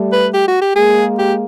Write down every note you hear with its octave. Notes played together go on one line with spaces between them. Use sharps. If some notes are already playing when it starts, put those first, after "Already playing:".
Already playing: G3 A3
B4
G4
F#4
G4
G#3 A#3 G#4
G4